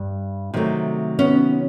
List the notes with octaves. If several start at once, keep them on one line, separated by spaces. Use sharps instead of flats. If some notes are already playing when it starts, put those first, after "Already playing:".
Already playing: G2
C3 D#3 F#3 A3
B3 C#4